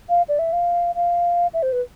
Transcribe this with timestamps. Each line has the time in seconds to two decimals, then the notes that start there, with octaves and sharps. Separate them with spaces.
0.09 F5
0.29 D5
0.39 E5
0.53 F5
0.95 F5
1.54 E5
1.63 C5
1.72 B4